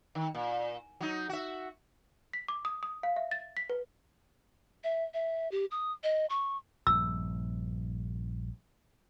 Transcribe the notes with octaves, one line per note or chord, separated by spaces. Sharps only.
D#3
A#2
F#3 D#4
F#4 E5
B6
D6
D#6
D#6
F5
E5
A6
B6
B4
E5
E5
G4
D#6
D#5
C#6
A#1 G2 E6